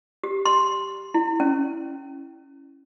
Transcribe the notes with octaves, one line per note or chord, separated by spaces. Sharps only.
G4
C6
E4
C#4